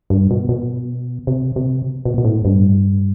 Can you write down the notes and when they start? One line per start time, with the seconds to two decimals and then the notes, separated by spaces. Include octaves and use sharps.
0.10 G2
0.30 B2
0.49 B2
1.27 C3
1.56 C3
2.05 B2
2.18 B2
2.25 A2
2.45 G2